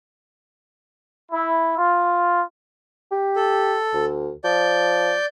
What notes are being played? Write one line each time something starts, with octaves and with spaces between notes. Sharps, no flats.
E4
F4
G4
A4
D2
F3 D5 G6